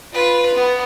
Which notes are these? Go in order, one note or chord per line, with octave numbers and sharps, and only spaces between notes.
F4 B4
B3